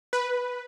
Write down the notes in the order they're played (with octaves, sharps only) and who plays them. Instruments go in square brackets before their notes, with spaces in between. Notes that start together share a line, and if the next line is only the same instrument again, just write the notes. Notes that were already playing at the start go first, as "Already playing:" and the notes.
[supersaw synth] B4